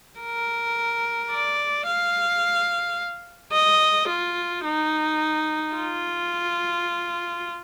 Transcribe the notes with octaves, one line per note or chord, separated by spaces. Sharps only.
A#4
D5
F5
D#5
F4
D#4
F4